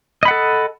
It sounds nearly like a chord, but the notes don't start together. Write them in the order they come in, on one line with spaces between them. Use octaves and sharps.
D#5 B5 F#5 A4